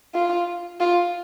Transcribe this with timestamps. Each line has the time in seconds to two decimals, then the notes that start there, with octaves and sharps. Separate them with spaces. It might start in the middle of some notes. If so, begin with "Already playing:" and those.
0.14 F4
0.80 F4